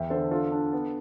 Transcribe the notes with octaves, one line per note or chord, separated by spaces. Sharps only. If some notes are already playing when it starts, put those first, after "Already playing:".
Already playing: E2 E5 G5
D3 A4 C5
D4 F4 A4
D4
B3